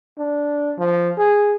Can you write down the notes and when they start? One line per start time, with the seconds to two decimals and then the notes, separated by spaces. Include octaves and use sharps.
0.18 D4
0.78 F3
1.18 G#4